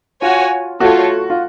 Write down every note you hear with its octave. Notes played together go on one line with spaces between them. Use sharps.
F4 F#4 C#5 G#5
A3 F4 F#4 A4 C#5
F4